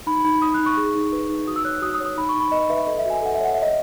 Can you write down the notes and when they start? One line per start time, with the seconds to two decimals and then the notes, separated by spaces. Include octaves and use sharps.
0.07 D#4 B5
0.25 D#4 B5
0.42 D#4 D#6
0.54 D#4 F#6
0.66 C#6
0.77 G#4
0.95 D#4
1.12 B4
1.29 D#4
1.47 F#4 D#6
1.56 E6
1.65 C#5 F#6
1.82 F#4 D#6
1.94 D#6
2.00 C#5
2.06 D#6
2.17 D#4 B5
2.29 C#6
2.34 D#4
2.40 B5
2.52 B4 D#5
2.70 B4 E5
2.87 A4 D#5
2.99 E5
3.05 F#4 G#5
3.22 A4 F#5
3.34 E5
3.40 C#5 F#5
3.54 E5
3.57 C#5 D#5